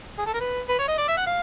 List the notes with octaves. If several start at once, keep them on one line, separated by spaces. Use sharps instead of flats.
G#4
A4
A#4
B4
B4
C#5
D#5
D5
E5
F#5
F5